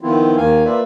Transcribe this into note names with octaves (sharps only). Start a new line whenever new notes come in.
D#3 F3 B3 C4 E4 F4
D#2 D#3 A#3 F5 G#5
A#3 F4 B4 D5 E5